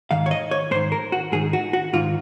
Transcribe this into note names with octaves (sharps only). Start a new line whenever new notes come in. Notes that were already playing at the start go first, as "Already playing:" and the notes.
G#2 D#3 F5
C#5
D#5
C#5
G#2 D#3 C5
A#4
F#4
G#2 D#3 G#4
F#4
F#4
G#2 D#3 F4